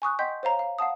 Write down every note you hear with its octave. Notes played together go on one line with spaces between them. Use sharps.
G#5 C#6 D#6 F#6
D#5 F#5 G5 C6 G6 B6
C5 C#5 F5 A#5
F5
F5 F#5 A5 D#6